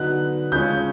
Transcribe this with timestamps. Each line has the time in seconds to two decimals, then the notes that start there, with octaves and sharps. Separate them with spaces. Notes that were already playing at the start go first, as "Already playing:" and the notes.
Already playing: D3 F#3 B3 D#4 F#6
0.52 C#3 F3 G#3 C#4 G6